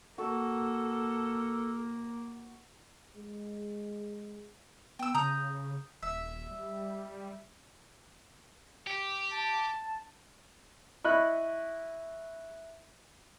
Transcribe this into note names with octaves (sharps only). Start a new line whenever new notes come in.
A#3 F#4 A4
G#3
B3 G5 E6
C#3 A#5 D#6 G6
D#1 E5
G3
G4
A5
E4 D#5 B5 C#6 F#6